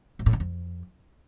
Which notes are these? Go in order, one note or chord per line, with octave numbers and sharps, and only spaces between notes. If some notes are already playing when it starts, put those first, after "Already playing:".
G#2
A2
D3
F2